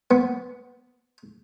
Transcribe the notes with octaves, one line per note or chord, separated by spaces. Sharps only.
B3